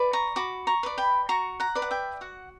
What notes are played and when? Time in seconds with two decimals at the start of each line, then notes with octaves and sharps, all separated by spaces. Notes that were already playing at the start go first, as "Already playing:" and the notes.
Already playing: B4 D5
0.13 A#5 C#6
0.36 F#4 B5 D6
0.67 A#5 C#6
0.83 B4 D5
0.98 G5 B5
1.29 F#4 A#5 C#6
1.60 F#5 A#5
1.75 B4 D5
1.82 F#5
1.91 E5 G5
2.21 F#4 F#5